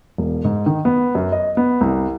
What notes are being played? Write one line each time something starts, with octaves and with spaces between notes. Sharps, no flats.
E1
G#2
D#3
B3
F#2
D#5
B3
C2